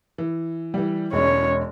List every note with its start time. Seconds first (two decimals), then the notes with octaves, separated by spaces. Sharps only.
0.18 E3
0.74 E3 G3
1.13 E1 G#3 C#4 C#5